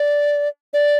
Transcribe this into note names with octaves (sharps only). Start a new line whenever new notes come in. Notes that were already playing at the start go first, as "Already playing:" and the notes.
Already playing: D5
D5